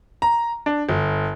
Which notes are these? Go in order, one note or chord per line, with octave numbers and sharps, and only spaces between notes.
A#5
D4
G1